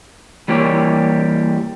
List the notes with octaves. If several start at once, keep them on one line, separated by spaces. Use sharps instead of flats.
E3 G3 A#3 G4 C#5